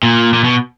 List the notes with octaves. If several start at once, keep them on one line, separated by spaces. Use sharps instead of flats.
A#2
A#2
B2